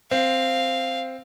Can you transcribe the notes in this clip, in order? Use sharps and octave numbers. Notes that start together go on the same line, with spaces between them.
C4 F5